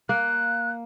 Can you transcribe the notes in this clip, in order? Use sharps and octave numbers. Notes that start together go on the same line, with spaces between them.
A#3 F#6